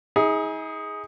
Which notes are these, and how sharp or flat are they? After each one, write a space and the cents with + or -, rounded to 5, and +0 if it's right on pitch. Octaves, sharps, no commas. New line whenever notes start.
D#4 +40 G#4 +0